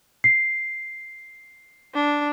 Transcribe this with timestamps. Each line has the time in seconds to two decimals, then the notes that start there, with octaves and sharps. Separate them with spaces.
0.24 C7
1.94 D4